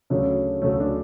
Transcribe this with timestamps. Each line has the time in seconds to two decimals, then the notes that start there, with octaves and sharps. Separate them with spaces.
0.10 D2 C#3 F#3 A3 D4
0.62 D2 C#3 F#3 A3 C#4
0.80 D4